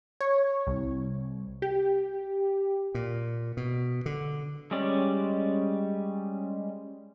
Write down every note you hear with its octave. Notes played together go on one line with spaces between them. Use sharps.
C#5
C2
G4
A#2
B2
D3
G3 G#3 C#4 D5